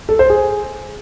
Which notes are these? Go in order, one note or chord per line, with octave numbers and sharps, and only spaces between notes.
A4
C5
G#4